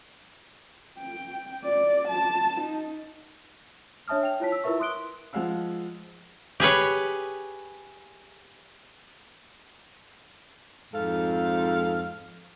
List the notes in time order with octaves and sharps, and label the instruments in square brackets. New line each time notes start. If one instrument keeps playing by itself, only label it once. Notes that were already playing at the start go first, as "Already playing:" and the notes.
[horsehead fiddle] G5
D5
A5
D#4
[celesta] D4 C#5 E5 A5 D#6 F6
G5 F7
E4 F4 C#5 A5 B6
E6
E4 F4 A#4 B4 E5 C#6
C6 D#6 F#6 D7 G7
[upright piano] F3 G#3 F5 F#5 E6
[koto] G4 G#4 B4 C#5
[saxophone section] F2 G#2 A4 F5